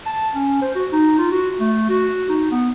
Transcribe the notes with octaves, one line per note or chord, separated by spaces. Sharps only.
A5
C#4
C5
F#4
D#4
F4
F#4
A3
F#4
D#4
B3